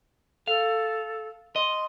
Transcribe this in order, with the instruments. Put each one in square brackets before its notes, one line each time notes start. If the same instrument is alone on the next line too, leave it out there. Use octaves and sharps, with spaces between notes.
[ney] A4 [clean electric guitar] F5
[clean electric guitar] D#5 [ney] C6